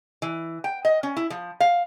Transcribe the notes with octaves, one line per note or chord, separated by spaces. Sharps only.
E3
G5
D#5
C#4
E4
F3
F5